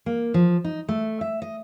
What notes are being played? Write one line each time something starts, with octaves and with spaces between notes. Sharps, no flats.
A#3
F3
D#4
A3
E5
D#5